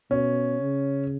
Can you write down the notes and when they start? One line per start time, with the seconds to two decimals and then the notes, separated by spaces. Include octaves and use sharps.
0.11 B2 C#4
0.62 C#3